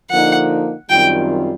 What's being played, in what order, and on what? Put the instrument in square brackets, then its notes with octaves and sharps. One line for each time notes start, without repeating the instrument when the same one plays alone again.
[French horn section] D3 F3 A#3 D#4 [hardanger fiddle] F#5
[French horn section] F#2 D#3 G3 C4 F4 [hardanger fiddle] G5